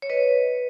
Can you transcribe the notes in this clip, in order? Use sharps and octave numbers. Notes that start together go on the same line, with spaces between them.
C#5
B4 D#5